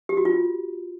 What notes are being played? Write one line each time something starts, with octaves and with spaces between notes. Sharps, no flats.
G4
F#4
F4